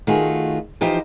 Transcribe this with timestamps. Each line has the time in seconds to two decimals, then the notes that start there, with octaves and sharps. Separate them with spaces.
0.07 D#3 A3 F4 F#4 G#4
0.81 E3 F3 D#4 F4 G4 C5